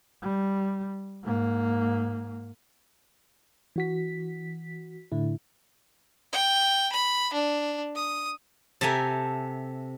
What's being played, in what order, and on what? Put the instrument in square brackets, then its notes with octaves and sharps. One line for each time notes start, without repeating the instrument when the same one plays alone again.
[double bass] G3
G#2 A#3
[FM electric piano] E3 F#4 B6
A2 D3 E4
[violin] G5
B5
D4
D#6
[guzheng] C3 A4 E5 G5 G#5 A#5